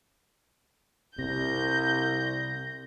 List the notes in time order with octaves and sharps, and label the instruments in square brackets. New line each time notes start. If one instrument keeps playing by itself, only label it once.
[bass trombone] C2 [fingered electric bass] C3 [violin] G6 [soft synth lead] A#6